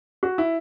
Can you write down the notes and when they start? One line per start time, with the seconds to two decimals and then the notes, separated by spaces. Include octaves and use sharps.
0.23 F#4
0.38 E4